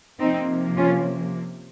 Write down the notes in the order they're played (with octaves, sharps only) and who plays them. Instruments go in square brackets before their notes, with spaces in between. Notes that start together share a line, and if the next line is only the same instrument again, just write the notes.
[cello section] C3 F3 A#3 C4 D#4
C#4 F4